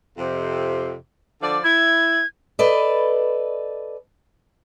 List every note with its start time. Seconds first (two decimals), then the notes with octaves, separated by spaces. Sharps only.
0.18 F2 C3
1.42 D3 F3 D5
1.64 E4 G#6
2.59 A4 B4 D5 D#5